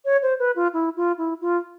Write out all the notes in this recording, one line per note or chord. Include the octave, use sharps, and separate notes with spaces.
C#5
C5
B4
F4
E4
F4
E4
F4